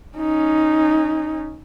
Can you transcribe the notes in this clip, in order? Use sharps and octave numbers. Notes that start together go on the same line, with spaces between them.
C#4 D#4